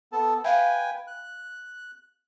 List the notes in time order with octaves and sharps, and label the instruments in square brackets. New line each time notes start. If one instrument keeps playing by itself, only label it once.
[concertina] B3 A4 A5
[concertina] B4 G5 G#5 [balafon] E5 F5
[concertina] F#6